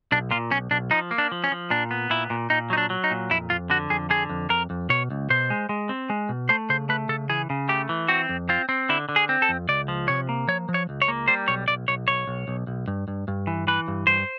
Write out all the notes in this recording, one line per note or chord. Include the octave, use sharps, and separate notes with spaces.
B1 D4
A#2 F4
B1 C#4
B1 D4
F3 D#4
A#3
D4
F3
C#4
F3
A#2 D4
B3
A#2 E4
A#2
A#2 D#4
F#3 D#4
D4
F#3
D#4
A#2
F2 E4
F2 F4
D3 F#4
F2 G#4
D3 G#4
F2
F2 A#4
F2
B2 C#5
C#2
B2 C5
G#3
G#3
C4
G#3
B2
A3 C5
C#3 C5
A3 B4
C#3 A4
E3 G#4
C#3
A3 G4
E3
C4 F#4
F2
C4 F4
C4
D3 E4
D3
G#4
C4
A4
F2
C#2 D5
F3
C3 C#5
A#3
F3 C#5
F3
C#5
C#2
C#5
A#3
G3 C5
B1 C#5
B1 D5
B1 C#5
B1 C#5
B1
B1
B1
G2
G2
G2
E3
E3 B4
G2
G2 C5